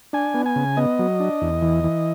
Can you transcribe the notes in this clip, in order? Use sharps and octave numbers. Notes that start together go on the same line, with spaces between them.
D4 G#5
B3
G#5
C#3
B3 D#5
F#3
D4
E2
E3
E3